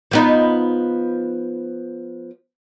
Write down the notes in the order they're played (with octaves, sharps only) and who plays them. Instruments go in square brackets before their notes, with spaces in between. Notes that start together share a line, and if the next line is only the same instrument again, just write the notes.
[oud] F3 B3 D#4